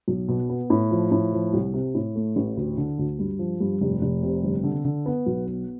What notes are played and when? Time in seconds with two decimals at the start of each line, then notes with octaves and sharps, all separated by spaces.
0.08 B1
0.28 B2
0.49 B3
0.70 A2
0.91 F3
1.11 A2
1.33 F3
1.53 C2
1.74 C3
1.95 A2
2.15 A3
2.36 A1
2.57 D2
2.77 D3
2.98 D2
3.19 G2
3.39 F3
3.60 G2
3.81 F1
4.02 F1
4.22 C3
4.43 G1
4.64 D3
4.85 D3
5.06 B3
5.26 B1
5.47 B3